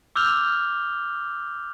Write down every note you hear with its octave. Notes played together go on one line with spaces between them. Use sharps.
D6 E6 F6 G6 F7 G7